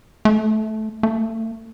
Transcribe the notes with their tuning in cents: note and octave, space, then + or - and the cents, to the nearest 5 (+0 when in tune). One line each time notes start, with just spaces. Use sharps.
A3 -15
A3 +35